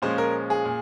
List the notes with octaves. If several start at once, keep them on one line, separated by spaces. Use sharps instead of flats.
A#2 F3 G#3 C#4 C5
A#4
G#4
A#2